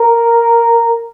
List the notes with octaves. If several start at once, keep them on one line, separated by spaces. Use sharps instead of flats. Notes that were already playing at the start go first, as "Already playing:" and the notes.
Already playing: A#4